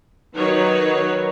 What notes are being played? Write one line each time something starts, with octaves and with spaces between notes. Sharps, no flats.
D#3 F#3 D#4 B4 C#5